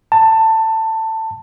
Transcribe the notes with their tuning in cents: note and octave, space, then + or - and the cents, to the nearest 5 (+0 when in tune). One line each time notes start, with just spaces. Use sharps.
A5 +15